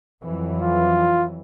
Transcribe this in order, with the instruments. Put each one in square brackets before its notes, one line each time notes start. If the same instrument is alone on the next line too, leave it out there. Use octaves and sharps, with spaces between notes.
[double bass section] F2 E3 F#3
[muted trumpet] F4